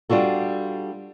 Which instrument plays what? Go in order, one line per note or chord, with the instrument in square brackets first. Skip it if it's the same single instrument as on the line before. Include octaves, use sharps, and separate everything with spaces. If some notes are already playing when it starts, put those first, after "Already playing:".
[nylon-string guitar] G3 D4 F4 F#4 A4